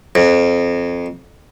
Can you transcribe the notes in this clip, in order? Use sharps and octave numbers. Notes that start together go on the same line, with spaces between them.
F2